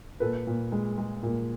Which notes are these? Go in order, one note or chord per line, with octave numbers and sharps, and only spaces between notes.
A#2 A4 B4
A#2
G#3
G#3
A#2